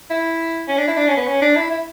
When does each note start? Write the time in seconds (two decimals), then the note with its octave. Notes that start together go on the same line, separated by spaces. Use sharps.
0.10 E4
0.68 C#4
0.78 D4
0.88 E4
0.97 D4
1.08 C#4
1.17 B3
1.27 C#4
1.42 D4
1.56 E4
1.71 E4